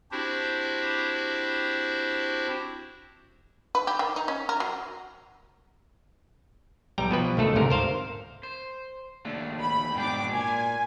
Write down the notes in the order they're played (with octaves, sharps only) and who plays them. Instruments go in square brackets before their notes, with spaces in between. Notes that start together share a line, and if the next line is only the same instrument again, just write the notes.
[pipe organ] C4 D4 E4 F#4 G4 C5
[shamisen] B4
G4
D#3
D#4
C#4
A#4
F#3
[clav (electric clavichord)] B1 G3 G5 A#5
B2 F3 B4
C#2 D#3 A3 A4
D2 G#2 C3 A#4
A#4 C5 F5
[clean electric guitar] C5
D#2 A3 D4
[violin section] B5
[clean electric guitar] G#2 B2 D4 [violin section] G5 D6
[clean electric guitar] A#2 [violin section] G#5